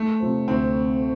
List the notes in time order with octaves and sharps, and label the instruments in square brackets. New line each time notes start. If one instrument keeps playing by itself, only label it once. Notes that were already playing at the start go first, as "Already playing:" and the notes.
Already playing: [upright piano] A3
[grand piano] C3 F3 C4
[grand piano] D2 [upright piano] C4